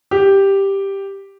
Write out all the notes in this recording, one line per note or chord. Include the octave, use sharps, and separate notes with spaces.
G4